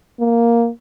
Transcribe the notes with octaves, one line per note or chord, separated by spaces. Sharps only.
A#3